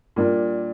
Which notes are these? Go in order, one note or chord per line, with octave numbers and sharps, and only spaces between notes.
A#2 G3 D4